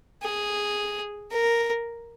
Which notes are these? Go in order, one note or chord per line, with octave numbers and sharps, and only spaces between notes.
G#4
A#4